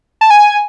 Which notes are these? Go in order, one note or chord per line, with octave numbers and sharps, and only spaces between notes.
A5
G#5